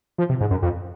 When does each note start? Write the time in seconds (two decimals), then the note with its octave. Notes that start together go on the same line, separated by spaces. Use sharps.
0.18 F3
0.29 C3
0.41 G#2
0.51 F#2
0.62 F2